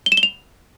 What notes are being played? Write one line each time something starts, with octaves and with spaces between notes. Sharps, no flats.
G7
E7
G7
F7